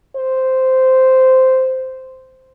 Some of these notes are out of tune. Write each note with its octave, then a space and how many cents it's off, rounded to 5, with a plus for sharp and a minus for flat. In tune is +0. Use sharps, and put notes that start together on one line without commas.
C5 -10